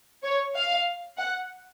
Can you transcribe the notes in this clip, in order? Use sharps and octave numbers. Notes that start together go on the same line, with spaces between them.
C#5
F5
F#5